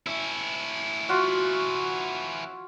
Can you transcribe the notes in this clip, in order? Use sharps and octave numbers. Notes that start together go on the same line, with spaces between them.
C#4 E4 E5
F4 F#4 E5